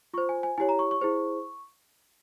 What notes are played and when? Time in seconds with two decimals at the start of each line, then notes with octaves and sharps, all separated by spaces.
0.14 F4 C5 C#6
0.29 G#5
0.43 G#5
0.58 E4 G4 C#5 G#5
0.69 A#5
0.79 C#6
0.91 C#6
1.01 E4 G#4 C5